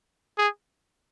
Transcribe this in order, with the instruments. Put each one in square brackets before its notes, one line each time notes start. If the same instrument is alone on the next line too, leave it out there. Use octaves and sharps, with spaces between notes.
[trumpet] G#4